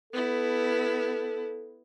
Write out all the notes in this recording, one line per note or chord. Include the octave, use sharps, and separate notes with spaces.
B3 E4 A4